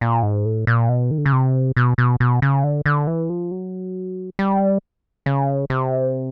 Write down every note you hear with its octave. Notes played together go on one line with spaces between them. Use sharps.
A#2
G#2
A2
A#2
B2
D#3
D3
C#3
C3
B2
B2
B2
C#3
D3
D3
E3
F3
F#3
G3
C#3
C3